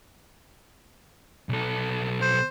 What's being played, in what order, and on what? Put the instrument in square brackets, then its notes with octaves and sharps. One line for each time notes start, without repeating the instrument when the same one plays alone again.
[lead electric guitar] B1 A4
[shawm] C5